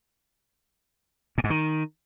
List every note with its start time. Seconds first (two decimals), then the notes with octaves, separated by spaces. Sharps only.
1.38 A#2
1.44 G#2
1.50 D#3